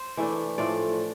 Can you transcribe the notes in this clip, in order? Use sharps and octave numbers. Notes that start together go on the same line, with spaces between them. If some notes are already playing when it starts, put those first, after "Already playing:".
Already playing: C5
E3 A3 D4
A2 F3 A3 D5